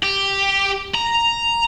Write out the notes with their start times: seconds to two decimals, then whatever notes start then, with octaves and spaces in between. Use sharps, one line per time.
0.03 G4
0.94 A#5